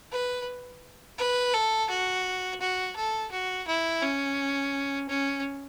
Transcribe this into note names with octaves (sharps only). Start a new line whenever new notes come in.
B4
B4
A4
F#4
F#4
A4
F#4
E4
C#4
C#4